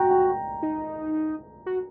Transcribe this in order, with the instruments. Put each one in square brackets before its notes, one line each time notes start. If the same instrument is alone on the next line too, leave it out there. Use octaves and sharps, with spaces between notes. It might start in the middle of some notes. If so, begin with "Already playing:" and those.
Already playing: [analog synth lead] F#4 [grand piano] G5 A#5
[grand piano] G5
[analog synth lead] D#4
F#4